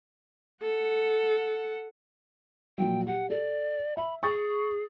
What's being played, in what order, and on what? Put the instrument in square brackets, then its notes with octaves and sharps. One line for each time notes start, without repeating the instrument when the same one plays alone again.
[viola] A4 F#5
[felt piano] A#2 F3 F#3 [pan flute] G5
[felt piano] G4 [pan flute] F#5
[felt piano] A4 [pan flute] D5
[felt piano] E5 [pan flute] B5
[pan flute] G#4 [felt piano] C#6 D#6 A6